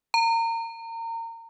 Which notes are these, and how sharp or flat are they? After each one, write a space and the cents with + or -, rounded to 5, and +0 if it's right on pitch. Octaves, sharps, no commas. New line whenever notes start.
A#5 -30